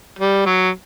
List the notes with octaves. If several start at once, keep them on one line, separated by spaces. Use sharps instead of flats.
G3
F#3